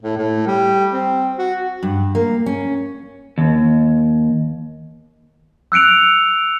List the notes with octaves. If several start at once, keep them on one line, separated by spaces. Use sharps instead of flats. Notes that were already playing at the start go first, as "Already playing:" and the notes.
A2
A2
G3
C4
F#4
G2
A#3
C#4
D#2
E6 F#6 C#7 D7 F7